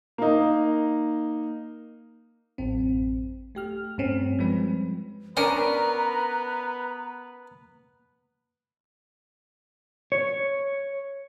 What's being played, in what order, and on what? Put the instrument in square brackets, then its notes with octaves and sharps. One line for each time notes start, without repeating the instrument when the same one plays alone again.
[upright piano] A#3 D#4
[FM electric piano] A1 F#2 C4
A3 G4 F6
G2 A3 C4 C#4
F3 G3 G#3 C4 B4
[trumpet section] B3 B4 [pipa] C#4 D4 [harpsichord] A#4 [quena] A#5
[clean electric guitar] C#5